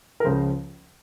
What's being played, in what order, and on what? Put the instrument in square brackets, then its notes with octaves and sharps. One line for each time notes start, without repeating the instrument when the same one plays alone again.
[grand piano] A#4
C#2 C#3 F3 C5